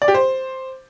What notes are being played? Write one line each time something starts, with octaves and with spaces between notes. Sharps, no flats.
D5
G4
C5